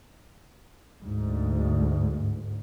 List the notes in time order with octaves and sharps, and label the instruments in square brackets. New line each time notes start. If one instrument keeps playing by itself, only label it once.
[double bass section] D2 G#2